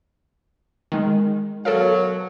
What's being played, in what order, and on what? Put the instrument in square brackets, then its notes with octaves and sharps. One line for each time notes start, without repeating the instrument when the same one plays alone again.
[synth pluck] D#3 G#3
[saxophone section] B2 F#3 [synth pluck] A4 A#4 F5